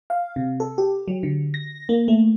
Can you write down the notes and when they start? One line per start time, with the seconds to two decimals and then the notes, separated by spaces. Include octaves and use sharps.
0.10 F5
0.36 C3
0.60 A4
0.78 G4
1.08 F#3
1.23 D3
1.54 A#6
1.89 A#3
2.08 A3